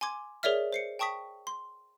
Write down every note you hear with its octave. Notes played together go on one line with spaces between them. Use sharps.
G#5 C6 D6 G#6
G#4 A#4 C#5 D5 E5 F6
C5 C7 C#7
G5 A5 C#6 D#6 B6
C6